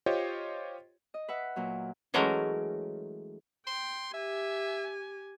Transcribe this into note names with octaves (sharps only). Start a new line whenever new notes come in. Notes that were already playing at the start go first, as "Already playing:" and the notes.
F4 G4 C5 C#5 D#5
D#5
B4 E5 F#5
A#2 F#3
E3 F#3 G#3 A3 C#4 A#4
G5 C6
G4 E5 G#5